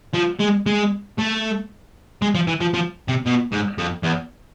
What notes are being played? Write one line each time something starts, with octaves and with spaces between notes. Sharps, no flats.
F3
G#3
G#3
A3
G#3
F3
E3
F3
F3
C3
B2
G#2
F2
E2